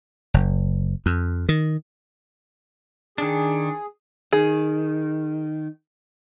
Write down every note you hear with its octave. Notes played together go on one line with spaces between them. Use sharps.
F#1
F2
D#3
D#3 D4 G#4
D#3 G#4